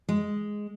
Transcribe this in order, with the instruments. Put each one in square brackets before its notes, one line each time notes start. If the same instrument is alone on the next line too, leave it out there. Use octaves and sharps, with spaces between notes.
[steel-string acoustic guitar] G#3